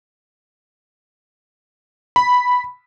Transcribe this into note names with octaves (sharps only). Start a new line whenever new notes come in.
B5